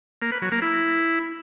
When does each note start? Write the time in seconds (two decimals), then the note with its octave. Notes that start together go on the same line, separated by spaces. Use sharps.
0.22 A#3
0.32 B4
0.42 F#3
0.52 A#3
0.62 E4